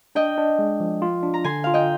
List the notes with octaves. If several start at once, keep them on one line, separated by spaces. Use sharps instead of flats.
D4 D#5 G5
D4
G#3
F3
F4
D4
A#5
D3 G#5 C6
F4 F5
D#5 G5